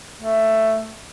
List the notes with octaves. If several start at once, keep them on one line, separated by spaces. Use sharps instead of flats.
A3